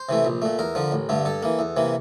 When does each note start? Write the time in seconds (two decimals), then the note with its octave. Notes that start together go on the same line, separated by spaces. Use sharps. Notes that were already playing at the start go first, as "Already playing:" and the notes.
Already playing: C5
0.09 C3 E3 A3
0.25 A#1
0.42 A#2 A3
0.59 E2 A#4
0.75 D3 F3
0.92 A1
1.09 G2 D3 A3
1.25 G2 A4
1.42 E3 A#3
1.59 E2
1.77 C3 E3 A#3